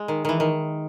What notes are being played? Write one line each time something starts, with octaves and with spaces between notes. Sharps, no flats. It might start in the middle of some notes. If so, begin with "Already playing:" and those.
Already playing: G#3
D#3
D#3 E3
D#3